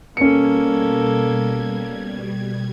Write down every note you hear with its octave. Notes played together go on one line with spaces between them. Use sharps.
B2 G3 A#3 C#4 A4 G#6 C#7